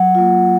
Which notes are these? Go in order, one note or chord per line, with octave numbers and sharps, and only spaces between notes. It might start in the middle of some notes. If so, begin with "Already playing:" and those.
Already playing: F#3 F#5
A#3 F4